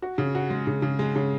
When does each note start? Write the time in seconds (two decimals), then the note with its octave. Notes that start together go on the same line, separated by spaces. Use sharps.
0.02 F#4
0.18 C#3
0.35 F#4
0.50 G#3
0.67 C#3
0.82 C#3
0.99 G#3
1.16 C#3